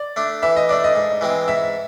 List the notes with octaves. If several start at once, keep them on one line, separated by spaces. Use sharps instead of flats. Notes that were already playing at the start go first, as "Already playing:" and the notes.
Already playing: D5
A3 D4
E3 E5
D#5
A3 D4 D5
D#5
G#2
E3 G#3 C4
G#2 E5